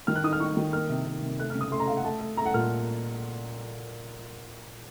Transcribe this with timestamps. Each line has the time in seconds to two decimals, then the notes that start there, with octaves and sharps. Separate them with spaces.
0.07 D#3 F6
0.16 F#6
0.24 D#4 D#6
0.33 F6
0.40 D#4 C#6
0.57 D#3
0.73 A#3 F6
0.90 C3
1.06 C3
1.22 C3
1.39 A3 F#6
1.50 F6
1.55 C#3
1.61 D#6
1.71 A3 C6
1.80 A#5
1.88 A3 F5
1.97 F#5
2.05 A3 A5
2.21 A3
2.37 A3 A#5
2.46 F#5
2.54 A#2 F6